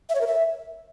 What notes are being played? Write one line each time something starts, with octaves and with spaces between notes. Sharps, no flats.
E5
C#5
A#4
E5